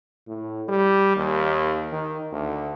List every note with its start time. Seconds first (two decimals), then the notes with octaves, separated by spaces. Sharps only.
0.27 A2
0.69 G3
1.16 D#2
1.92 D#3
2.32 D2